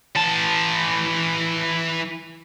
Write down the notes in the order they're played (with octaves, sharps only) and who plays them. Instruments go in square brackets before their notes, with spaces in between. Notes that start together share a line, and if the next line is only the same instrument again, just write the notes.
[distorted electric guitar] E3 A5